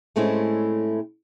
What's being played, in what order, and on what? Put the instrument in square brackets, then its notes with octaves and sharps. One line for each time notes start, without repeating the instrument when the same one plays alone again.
[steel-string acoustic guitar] A2 G#3 A3 C4 C#4 E4